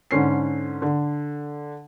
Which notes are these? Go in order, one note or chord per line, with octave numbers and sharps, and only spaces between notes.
G#2 D3 C#4 C7
D3